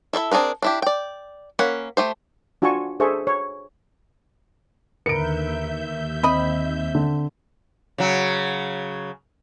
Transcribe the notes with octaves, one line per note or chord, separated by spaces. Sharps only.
E4 A4 E5 B5
C4 D4 G#4 A#4 B4
D4 E4 G4
D5 G5
A#3 C#4 F#5 B5
A3 G4 C5
D4 F4 F#4 G#5 A5 C#6
D4 G#4 A4 C5 E5 C#6
C#5
D#2 D3 A#4 B4 E5 G6 C#7 D7
C4 D#5 B5
D3
C#3 F#3